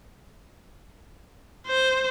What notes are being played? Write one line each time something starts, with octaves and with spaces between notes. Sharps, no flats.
C5